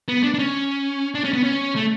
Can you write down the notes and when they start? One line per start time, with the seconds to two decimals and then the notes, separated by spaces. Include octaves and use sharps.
0.08 B3
0.23 D4
0.34 D4
0.39 C#4
1.15 D4
1.24 C#4
1.33 B3
1.44 C#4
1.76 A3